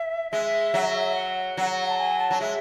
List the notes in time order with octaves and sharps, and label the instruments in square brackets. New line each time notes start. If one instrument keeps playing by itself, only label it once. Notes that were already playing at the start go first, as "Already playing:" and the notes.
Already playing: [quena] E5
[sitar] G#3 [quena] E5
[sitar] F#3
[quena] F#5
[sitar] F#3
[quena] A5
G#5
A5
[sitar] F#3
[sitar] G#3 [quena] E5